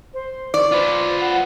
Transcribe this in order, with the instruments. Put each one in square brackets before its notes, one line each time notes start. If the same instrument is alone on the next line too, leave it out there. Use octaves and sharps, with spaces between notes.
[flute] C5
[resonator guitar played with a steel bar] D5
[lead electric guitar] F4 B4 [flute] C5
[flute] F#5